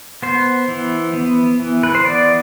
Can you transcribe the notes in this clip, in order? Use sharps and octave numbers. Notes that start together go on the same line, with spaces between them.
B3 C5
E3
B3
E3
B4
C5
B3 D5